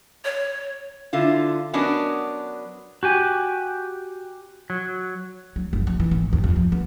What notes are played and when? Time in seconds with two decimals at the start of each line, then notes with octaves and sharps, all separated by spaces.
0.25 C#5
1.13 D3 E4 F4
1.73 F#3 B3 C#4 D4 A#4 D#5
3.03 F#4 G4 G#5
4.70 F#3
5.56 F#3
5.73 F#1
5.87 F3
6.00 E3
6.11 G#1
6.33 D#2
6.44 F2
6.56 F3
6.72 B3